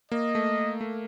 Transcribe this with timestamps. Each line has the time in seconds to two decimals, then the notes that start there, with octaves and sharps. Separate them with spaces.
0.12 A#3 D#5
0.35 A3
0.81 A3